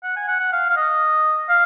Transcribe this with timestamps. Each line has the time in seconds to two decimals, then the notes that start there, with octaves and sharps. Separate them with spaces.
0.04 F#5
0.17 G#5
0.28 F#5
0.40 F#5
0.53 F5
0.70 F5
0.77 D#5
1.49 F5